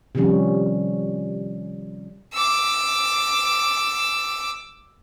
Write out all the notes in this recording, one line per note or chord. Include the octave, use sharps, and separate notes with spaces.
C3 D#3 F3 G3 C#4
D6 E6